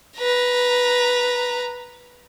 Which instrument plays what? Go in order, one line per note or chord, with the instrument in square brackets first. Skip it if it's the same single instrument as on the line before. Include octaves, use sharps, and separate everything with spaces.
[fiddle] B4 A#5